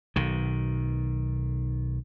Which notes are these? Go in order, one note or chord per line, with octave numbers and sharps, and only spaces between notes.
B1 D#3